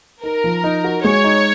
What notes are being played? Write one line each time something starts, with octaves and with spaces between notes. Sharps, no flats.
D#4 A#4
F3
D#4
F#4
G#3 C#5
D#4